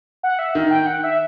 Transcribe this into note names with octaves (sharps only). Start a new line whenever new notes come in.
F#5
E5
D#3
G5
F#5
E5